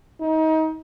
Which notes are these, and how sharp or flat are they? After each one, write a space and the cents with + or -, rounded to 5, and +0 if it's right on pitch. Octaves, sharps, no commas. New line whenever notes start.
D#4 +30